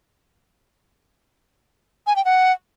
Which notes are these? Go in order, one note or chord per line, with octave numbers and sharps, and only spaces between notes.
G#5
G5
F#5